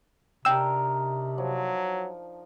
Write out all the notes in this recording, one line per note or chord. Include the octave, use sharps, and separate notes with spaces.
C3 D4 D#4 A#4 G5 E6
F3 F#3